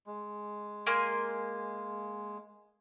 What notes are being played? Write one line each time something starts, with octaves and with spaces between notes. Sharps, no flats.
G#3
A#3 G#5 C6